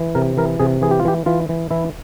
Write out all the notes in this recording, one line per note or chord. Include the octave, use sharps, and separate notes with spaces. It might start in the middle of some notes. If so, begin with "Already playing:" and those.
Already playing: E3
C3 A#4
E3 A#4
C3 G#4
E3 G#4
G4
F4
E3 G4
E3 F4
E3
E3 E4